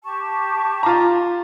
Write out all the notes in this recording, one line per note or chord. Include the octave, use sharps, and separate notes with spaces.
G4 A5 C#6
F4 A#5